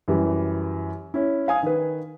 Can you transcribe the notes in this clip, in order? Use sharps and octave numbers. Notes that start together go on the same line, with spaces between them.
F#2 E3 G3
C#4 E4
F5 G#5 D#6
D#3 B4